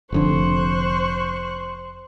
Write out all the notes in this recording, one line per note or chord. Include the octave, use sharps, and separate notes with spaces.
F1 F2 D3 C5 C#6 F#6